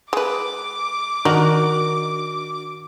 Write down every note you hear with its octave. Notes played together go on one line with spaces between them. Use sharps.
G#3 B4 D6
D#3 D4 F#4 A#4